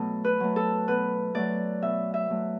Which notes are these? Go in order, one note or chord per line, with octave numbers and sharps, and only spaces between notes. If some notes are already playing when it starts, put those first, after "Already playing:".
Already playing: B2 F#3 A3 F#4 A4
B4
F#3 A3
A4
B2 B4
F#3 A3 D5
B2 E5
E5
F#3 A3